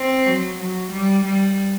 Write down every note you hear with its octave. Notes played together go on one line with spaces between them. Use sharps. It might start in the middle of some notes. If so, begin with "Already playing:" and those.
Already playing: C4
F#3
F#3
G3
G3